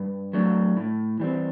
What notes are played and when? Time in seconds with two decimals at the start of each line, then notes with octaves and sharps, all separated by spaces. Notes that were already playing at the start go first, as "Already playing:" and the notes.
Already playing: G2
0.33 F#3 A3 D4
0.77 A2
1.20 E3 G3 C4